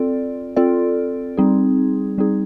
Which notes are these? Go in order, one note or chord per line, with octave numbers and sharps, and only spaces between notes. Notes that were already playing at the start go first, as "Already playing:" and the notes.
Already playing: C4 F4 A4 D5
C4 F4 A4 D5
G3 C4 D#4 G#4
G3 C4 D#4 G#4